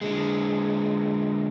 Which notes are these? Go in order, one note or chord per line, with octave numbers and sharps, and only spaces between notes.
D3 G#3